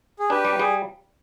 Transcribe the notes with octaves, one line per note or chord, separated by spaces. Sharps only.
G#4
D4 G4 B4
G3
G3 G#4